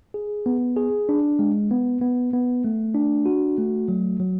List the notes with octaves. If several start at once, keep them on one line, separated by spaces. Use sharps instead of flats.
G#4
B3
G#4
D4
G#3
B3
B3
B3
A3
D4
F#4
A3
F#3
F#3